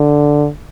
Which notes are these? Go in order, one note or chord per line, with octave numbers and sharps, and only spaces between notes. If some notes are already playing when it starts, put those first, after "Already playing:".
Already playing: D3